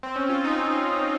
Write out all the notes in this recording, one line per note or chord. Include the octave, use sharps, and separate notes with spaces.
C4
C#4
F4
D#4